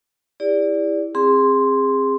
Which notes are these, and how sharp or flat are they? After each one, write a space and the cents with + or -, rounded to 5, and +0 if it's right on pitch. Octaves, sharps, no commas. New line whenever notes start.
E4 +0 G4 +45 D5 -15
C4 +30 G#4 -25 C6 +0